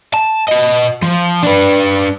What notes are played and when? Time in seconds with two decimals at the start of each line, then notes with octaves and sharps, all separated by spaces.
0.13 A5
0.49 F#4 D#5
1.02 F3
1.43 D4 B4